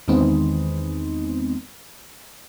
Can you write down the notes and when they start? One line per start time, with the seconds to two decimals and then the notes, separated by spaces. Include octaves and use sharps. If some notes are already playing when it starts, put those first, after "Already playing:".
0.08 E2 D#3 G#3 B3 C4 D#4